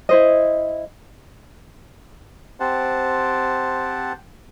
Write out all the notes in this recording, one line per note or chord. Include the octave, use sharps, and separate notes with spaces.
E4 C5 D#5
C4 G4 C5 F#5 A5